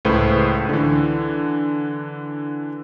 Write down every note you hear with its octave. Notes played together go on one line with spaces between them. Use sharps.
C#2 A2 G#3 A3 B4 C5
D3 E3